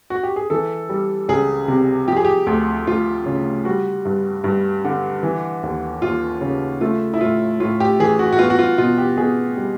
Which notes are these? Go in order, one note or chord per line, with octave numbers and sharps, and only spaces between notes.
F#4
G4
G#4
E3 A4
G3
C#2 G#4
C3
F3 G4
G#4
G4
D2
D2 F4
C#3
G3 F#4
G2
G2
D3
E3
D#2
D#2 F4
C#3
A3 F4
E4
A2 F4
A2 F4
G4
E3 G#4
F#4
F#4
B3 F4
F#4
F4
B2 F4
G4
B2 G#4
G3